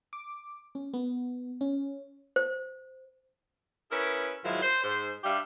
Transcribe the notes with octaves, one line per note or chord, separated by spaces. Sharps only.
D6
C#4
B3
C#4
C5
C#4 E4 G#4 A#4 B4
G#2 D#3 F3 F#3 E4
C5
G#2 C5
G3 D4 G4 E5 F5